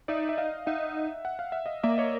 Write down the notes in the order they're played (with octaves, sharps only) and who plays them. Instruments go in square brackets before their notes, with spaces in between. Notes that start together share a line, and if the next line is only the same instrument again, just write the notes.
[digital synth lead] D#4 [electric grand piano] D5 E5
[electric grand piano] E5
D#5 F5
[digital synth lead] D#4 [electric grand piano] E5 F#5
[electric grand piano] F#5
F5
E5
D#5 F5
[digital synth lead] A#3 [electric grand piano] D5 E5
[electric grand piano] C#5 D#5